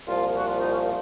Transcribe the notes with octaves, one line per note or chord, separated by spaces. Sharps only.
C2 A#2 F3 F4
F#4
F4
D#4
C#4